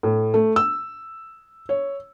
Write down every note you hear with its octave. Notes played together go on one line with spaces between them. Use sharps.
A2
A3
E6
C#5